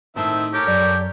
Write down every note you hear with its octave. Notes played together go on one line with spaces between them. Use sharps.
A2 D#3 C4 D#4 E5 A5
G4 A4 A#4 C#5
F#2 D5